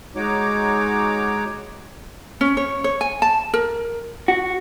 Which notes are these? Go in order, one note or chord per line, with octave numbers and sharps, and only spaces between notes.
G#3 D#4 F#4 C#5 D6
C#4
C#5
C#5
G#5
A5
A#4
F#4